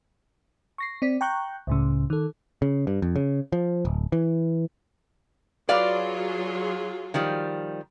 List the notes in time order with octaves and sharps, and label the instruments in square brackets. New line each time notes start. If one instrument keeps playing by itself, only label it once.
[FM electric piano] C#6 A#6 C7
C4 D5 B6
G5 A#5 C#6 F#6 G6
C#2 A2 C#3
D#3 A4
[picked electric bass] C#3
G2
F2
C#3
F3
D1
E3
[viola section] F#3 F4 G#4 [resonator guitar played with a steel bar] B4 D5 F5
[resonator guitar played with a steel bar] D#3 F3 G3